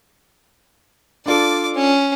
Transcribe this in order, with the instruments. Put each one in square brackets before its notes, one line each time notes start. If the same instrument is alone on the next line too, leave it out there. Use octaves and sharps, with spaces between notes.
[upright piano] D4 F4 A4 [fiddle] D5 D6
[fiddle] C#4